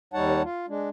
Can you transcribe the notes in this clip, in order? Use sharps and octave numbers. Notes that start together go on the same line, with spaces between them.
D#2 G3 D#4 C#5 F#5 A5
F4
G#3 D4